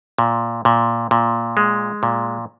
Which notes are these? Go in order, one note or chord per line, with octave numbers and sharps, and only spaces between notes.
A#2
A#2
A#2
G#3
A#2